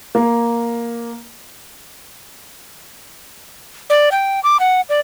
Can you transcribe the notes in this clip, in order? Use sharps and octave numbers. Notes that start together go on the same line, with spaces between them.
A#3
D5
G5
D6
F#5
D5